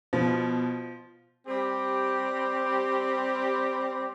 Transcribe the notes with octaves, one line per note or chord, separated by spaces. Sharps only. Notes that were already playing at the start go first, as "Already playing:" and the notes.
B2 F3
G3 C4 G4